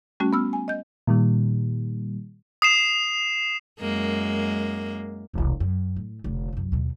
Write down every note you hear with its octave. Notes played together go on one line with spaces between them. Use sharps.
G3 A3 C#4 F#4
B3 E6 F6
G#5
D#5 G6
A#2 D#3 G3
D#6 C7 E7
F#2 G#3 A#3
E1 C2
F#2
A2
F1 D3
C2 F#2
D#2 B2